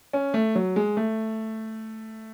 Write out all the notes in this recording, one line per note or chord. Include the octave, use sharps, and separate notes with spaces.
C#4
A3
F#3
G#3
A3